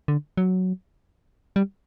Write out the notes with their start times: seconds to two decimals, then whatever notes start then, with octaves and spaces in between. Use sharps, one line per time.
0.08 D3
0.37 F#3
1.56 G3